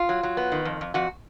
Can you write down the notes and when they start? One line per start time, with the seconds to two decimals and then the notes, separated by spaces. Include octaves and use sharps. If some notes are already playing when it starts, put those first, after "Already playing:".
Already playing: F4
0.09 F#3
0.23 F#3
0.37 B3
0.52 D#3
0.65 F2
0.81 F2
0.94 F2 F#4